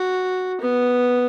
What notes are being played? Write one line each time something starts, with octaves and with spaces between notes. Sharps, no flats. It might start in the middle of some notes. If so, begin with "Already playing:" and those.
Already playing: F#4
B3